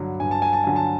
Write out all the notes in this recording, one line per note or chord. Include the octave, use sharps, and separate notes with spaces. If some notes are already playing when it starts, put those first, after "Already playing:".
Already playing: G2 D3 F#3
G2 G#5
A5
G#5
A5
D3 F#3 G#5
A5